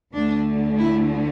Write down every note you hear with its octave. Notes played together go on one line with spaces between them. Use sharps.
D2 D3 A3 D4
E4